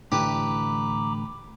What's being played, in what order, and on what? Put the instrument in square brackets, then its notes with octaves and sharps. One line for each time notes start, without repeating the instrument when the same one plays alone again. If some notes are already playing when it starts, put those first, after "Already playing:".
[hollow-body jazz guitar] A2 D3 E3 [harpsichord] G4 B4 [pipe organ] A#5 B5 D6